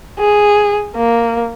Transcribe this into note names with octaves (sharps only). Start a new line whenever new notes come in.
G#4
A#3